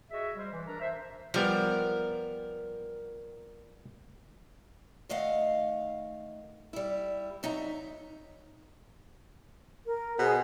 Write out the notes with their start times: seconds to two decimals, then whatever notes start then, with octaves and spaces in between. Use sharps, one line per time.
0.11 F#4 G#4 D#5 E5
0.37 G3 G#3 C5
0.53 E3
0.67 D4 A#4 A#5
0.81 C5 E5
1.34 F3 G3 B3 A#4
5.09 D#3 A3 D#5 F5 F#5
6.73 G3 E4
7.43 F#3 D#4 E5 A#5
9.86 A#4
10.19 B2 G#4 C5